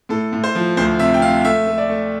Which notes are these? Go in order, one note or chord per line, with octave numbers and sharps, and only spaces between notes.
A2 A4
A2
C5
F3
D2 C5
C3 E5
G5
C3 F5
A3 E5
A3
D5
A3